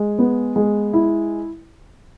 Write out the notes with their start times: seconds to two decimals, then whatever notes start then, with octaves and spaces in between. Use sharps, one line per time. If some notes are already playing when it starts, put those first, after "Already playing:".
Already playing: G#3
0.19 B3
0.56 G#3
0.93 E4